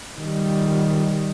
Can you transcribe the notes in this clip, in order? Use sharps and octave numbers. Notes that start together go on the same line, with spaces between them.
D#3 G3